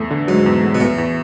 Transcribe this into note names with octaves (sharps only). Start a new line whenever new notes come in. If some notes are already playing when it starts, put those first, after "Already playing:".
Already playing: E2 A2 A3
D3
G#2 F#3
E2
A3
B2
E2 A2
E2